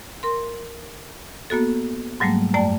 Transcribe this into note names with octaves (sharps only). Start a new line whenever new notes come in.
A#4 C6
A#3 B3 F#4 A4
G#2 F#3 G3 A3 A#3
F#2 A3 D5 G5 A5